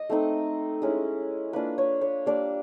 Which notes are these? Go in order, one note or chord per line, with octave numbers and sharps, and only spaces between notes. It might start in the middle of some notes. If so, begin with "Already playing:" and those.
Already playing: D#5
A3 C4 D#4
G#3 C#4 E4
A#3 D4 F4 B4
C#5
C#5
G3 A#3 D4 D5